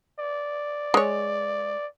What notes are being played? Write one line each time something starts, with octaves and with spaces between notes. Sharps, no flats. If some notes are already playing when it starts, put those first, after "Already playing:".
D5
G#3 C#5